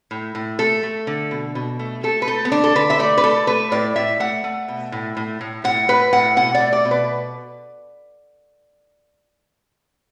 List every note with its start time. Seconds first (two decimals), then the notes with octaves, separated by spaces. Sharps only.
0.11 A2
0.35 A2
0.59 A3 A4
0.83 A3
1.07 D3
1.31 B2
1.55 B2
1.79 A3
2.03 A3 A4
2.22 B4
2.27 A3 A4
2.45 B3
2.52 D3 D4
2.64 A4
2.75 D3 B4
2.90 E5
2.99 A3 D5
3.17 B4
3.24 A3 A4
3.47 A3 B4
3.72 A2 D5
3.96 A2 E5
4.20 A3 F#5
4.44 A3
4.68 B2
4.92 A2
5.17 A2
5.41 A2
5.64 A2 F#5
5.88 A2 B4
6.13 A2 F#5
6.36 B2 F#5
6.55 D5
6.60 A3
6.73 D5
6.85 B2
6.91 B4